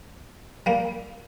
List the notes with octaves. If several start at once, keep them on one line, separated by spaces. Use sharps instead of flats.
G3 A#3